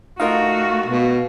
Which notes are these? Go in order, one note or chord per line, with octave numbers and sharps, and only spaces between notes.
A3 D#4 F4 F#4 A#4 F5
B2